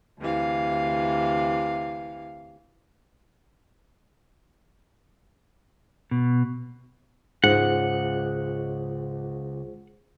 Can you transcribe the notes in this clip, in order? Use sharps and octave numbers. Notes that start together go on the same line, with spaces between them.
D2 C3 E3 F5
B2
C#2 G#2 C#3 F4 G#4 C5 F#5